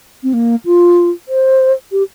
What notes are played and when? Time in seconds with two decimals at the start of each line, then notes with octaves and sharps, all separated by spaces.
0.23 C4
0.34 A#3
0.65 F4
1.28 C5
1.92 G4